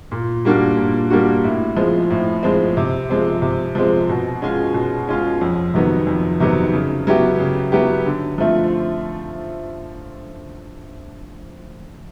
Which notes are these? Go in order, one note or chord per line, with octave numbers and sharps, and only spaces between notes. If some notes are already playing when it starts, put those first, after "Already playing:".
A#2
G3 A#3 D4 F#4
A#2
G3 A#3 D4 F#4
A2
F3 G#3 C4
A2
F3 G#3 C4
C3
F3 G#3 C4
C3
F3 G#3 C4
B2
G#3 C#4 F4 G#4
B2
G#3 C#4 F4 G#4
F2
C3 D#3 F#3 B3
F2
C3 D#3 F#3 B3
C#3
F#3 B3 E4 G4
C#3
F#3 B3 E4 G4
D3
F3 A3 C4 F4